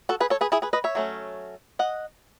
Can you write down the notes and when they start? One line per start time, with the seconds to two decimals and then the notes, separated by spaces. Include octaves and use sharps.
0.09 F#4 A4
0.20 G#4 B4
0.30 A4 C#5
0.41 G#4 B4
0.52 E4 G#4
0.62 G#4 B4
0.73 B4 D#5
0.84 C#5 E5
0.95 F#3 A3 C#4
1.79 D#5 F#5